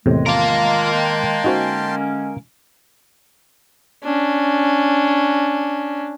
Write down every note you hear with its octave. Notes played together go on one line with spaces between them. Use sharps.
E2 A2 C3 D#3 G#3
A#3 F4 A#4 F5 A5
G5 A5 C6
D3 G#3 C#4 D#4 F#4 C5
C#4 D4